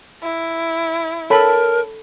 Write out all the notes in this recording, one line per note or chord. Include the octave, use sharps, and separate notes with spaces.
E4
A4 A#4 C#5 A5 B5